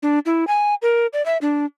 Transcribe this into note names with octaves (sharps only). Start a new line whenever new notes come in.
D4
E4
G#5
A#4
D5
E5
D4